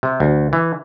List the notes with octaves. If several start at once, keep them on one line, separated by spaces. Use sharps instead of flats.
C3
D2
E3